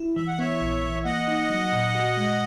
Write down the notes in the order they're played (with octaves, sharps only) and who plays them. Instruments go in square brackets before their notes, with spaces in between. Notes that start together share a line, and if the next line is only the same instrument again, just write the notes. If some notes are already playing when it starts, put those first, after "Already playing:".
Already playing: [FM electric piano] E4
[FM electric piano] E3 [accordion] E5
[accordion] F#5
[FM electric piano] B3 [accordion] C#5 E5
[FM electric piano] A#1
E3
[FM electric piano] A#3 [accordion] D#5 F#5
[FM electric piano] D#4
F#3
A#2
F#4
G#3